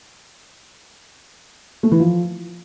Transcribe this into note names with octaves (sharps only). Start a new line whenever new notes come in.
A3
E3
F3